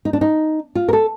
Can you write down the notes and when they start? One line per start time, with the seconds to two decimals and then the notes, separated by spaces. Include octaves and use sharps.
0.05 D#4
0.13 D4
0.21 D#4
0.75 F4
0.88 A#4
0.93 A4